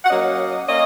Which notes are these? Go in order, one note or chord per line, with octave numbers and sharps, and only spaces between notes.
F#5
F#3 A#3 C#4 D#5
A#3 C#4 D#5